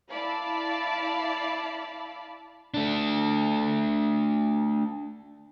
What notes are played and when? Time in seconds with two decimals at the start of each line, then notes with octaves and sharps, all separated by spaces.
0.11 E4 D5 F5 A5 B5
2.74 A3 D4